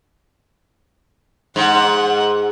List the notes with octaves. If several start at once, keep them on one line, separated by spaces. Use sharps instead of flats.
G#2 F#5